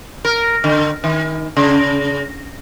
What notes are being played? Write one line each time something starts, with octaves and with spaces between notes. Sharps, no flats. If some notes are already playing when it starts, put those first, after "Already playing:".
A#4
D3
D#3
C#3